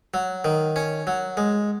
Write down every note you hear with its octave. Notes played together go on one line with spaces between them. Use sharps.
F#3
D#3
C#4
F#3
G#3